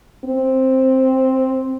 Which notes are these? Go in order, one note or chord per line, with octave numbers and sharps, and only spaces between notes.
C4